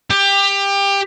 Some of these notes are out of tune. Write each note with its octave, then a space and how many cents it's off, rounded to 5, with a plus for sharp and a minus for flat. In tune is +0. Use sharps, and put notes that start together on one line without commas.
G4 +20